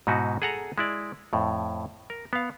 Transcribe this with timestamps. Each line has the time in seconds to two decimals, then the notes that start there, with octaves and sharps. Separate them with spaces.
0.07 G#2 B2 D#4 E4 F#4
0.42 G#4 A4 F#5 G#5 A#5
0.78 G#3 E4 D5
1.33 F2 A2
2.10 A#4
2.33 B3 F5